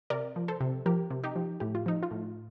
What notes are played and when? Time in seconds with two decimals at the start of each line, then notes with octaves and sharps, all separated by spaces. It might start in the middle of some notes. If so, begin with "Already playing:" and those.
0.10 C3 A#4 D5
0.36 F3
0.48 A4 C5
0.61 C3
0.86 F3 G4 A#4
1.10 C3
1.24 D#4 G4
1.36 F3
1.60 A2 G4
1.75 F4
1.86 F3 D#4
2.03 F4
2.11 A2